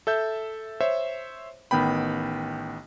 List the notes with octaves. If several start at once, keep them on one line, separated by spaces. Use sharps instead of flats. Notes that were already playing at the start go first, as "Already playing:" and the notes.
A4 E5 G6
C5 C#5 E5
A1 D#3 B3 G5 B5